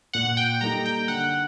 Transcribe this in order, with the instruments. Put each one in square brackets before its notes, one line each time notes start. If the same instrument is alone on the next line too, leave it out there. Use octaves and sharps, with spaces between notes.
[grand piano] A#2 [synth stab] F#5
[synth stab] G5
[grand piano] G3 A#3 D#4 A4 [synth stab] A#5
[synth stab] G5
[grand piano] D3 [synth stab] F#5